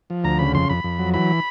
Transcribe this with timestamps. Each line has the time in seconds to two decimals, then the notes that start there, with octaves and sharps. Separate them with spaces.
0.10 F3
0.24 D2 A#5
0.39 C#3 B5
0.54 F2 C6
0.69 F2 B5
0.84 F2
0.99 F#3
1.14 E3 B5